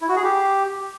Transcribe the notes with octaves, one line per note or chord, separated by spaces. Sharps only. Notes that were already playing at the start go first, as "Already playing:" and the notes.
E4
F#4
G#4
G4